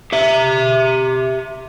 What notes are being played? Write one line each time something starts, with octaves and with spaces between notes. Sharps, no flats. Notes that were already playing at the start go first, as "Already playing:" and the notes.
G4 E5